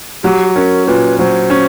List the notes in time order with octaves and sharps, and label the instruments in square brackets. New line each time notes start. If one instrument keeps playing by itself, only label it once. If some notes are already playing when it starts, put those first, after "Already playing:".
[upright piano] F#3 [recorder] G4
[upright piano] C#4 [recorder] A#4
[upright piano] A#2 [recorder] B4
[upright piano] F#3 [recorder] C5
[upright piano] C#4